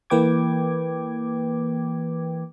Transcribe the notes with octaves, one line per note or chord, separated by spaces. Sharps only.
E3 A#3 B4 G5 D6 G#6